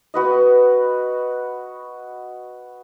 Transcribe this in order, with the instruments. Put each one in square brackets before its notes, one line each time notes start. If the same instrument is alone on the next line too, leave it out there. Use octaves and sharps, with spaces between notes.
[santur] F#4 B4 D#5